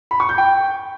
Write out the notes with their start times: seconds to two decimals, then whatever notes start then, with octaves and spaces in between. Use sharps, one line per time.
0.11 B5
0.20 C#6
0.29 G6
0.38 G5